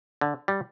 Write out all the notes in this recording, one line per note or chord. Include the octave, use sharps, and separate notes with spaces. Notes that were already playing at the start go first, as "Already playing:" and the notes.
D3
G3